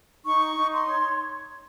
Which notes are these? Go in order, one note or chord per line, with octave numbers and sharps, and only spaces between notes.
D#4 C#6
D#4
C6
C#5